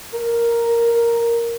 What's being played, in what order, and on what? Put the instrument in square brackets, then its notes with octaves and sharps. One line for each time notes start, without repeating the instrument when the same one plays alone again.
[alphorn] A#4